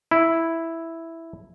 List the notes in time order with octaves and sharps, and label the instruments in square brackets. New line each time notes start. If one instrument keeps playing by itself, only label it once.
[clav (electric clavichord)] E4